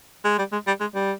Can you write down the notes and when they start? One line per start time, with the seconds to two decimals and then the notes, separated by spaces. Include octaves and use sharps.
0.24 G#3
0.38 G3
0.52 G#3
0.67 G3
0.80 G#3
0.95 G3